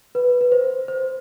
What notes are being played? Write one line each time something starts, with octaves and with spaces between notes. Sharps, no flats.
B4
B4
C5
C5